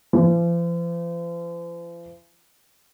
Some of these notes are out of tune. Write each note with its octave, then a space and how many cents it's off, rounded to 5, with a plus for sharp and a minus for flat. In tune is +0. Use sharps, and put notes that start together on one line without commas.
F3 -45